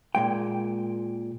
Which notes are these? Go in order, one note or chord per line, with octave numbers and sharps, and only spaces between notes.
A#2 G#3 G5